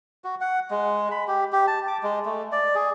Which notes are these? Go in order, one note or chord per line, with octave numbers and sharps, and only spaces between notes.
F#4
F#5
G#3
B5
G4
G4
A5
D6
G#3
A3
D5
G#4